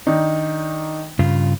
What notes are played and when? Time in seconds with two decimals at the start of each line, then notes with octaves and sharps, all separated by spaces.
0.07 D#3 D4 D#4
1.19 G2 C#3 F4